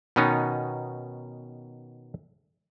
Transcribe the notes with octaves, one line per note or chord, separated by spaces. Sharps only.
B2 D#3 B3 C#4 D#4